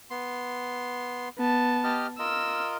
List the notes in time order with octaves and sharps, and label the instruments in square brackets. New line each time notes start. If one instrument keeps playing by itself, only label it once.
[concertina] B3 C6
[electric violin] B3 A5
[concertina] G4 D#5 F6
[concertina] F4 A#4 D#5 [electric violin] E6